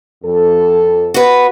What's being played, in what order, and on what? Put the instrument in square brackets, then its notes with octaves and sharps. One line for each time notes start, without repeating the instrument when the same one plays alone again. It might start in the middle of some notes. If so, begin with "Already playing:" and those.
[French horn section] F2 A4
[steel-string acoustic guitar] F#4 B4